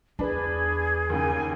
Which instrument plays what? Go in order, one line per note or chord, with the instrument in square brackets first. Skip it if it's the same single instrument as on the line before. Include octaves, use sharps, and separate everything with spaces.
[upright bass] E2 [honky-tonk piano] D4 B4 [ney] G#4
[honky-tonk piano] D#2 C#3 [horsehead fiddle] G5 G#5